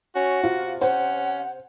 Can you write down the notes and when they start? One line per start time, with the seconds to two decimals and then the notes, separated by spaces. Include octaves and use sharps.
0.15 C#4 F#4
0.43 C3 F4
0.81 C#4 C5 F#5